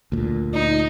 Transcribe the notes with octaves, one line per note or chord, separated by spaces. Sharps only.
D2 A#2
D#4